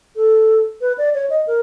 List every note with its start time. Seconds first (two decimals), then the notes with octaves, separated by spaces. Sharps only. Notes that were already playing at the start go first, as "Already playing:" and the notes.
0.16 A4
0.81 B4
0.98 D5
1.14 C#5
1.30 D#5
1.47 A#4